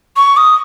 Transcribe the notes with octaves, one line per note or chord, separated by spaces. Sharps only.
C#6
D#6